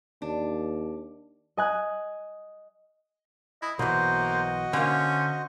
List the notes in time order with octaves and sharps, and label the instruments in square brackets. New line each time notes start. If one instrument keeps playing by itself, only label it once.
[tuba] D#2 [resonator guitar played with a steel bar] D4
[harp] D#5 G#5 F#6
[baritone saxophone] E4 [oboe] D#5
[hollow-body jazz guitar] B1 E3 [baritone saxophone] A#3 [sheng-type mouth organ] F#4 D#5 [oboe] C5
[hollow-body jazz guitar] D3 A#3 [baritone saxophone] C#4 [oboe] C5